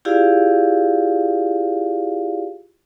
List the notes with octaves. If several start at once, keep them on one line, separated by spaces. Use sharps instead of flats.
E4 F4 G4 G#4 D5 F5